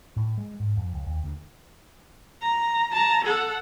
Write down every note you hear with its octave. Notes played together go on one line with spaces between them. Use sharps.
A2
G#3
G#2
F2
C#2
D#2
D2
A#5
A5 A#5
A4 F#5